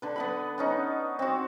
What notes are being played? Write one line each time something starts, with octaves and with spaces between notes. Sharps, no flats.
D3 B4
B3 F#5 B5
B3 C#4 D#4
C4 F#4